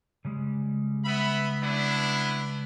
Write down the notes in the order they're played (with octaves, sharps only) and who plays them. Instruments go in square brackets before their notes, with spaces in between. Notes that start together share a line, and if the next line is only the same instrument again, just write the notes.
[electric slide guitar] C#3 G3 G#3
[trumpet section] B3 E5 B5
B3 D4 E4